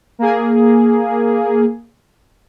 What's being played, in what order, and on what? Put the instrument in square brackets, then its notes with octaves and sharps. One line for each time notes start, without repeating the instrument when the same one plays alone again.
[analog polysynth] A#3 G#4